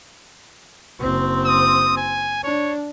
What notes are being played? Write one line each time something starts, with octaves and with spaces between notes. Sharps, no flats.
F#1 C4
D#6
G#5
D4 C#5